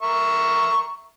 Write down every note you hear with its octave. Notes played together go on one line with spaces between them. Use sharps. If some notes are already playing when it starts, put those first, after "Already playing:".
A#4 E5 C#6